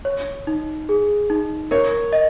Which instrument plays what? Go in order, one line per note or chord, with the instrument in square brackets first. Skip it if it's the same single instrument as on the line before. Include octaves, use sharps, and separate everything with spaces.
[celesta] C#5
D#4
G#4
D#4
[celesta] A#4 [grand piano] C#5
[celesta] D#5